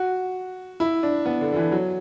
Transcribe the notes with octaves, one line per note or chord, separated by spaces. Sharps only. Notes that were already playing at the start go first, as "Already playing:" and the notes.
Already playing: F#4
E4
D4
B3
D3
D3
E3
F#3